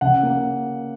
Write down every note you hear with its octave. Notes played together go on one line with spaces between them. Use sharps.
C#3 F#5
A#3